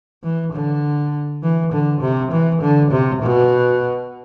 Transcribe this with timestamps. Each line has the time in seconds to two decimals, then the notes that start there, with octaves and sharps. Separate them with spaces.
0.23 E3
0.52 D3
1.43 E3
1.72 D3
2.01 C3
2.31 E3
2.61 D3
2.91 C3
3.21 B2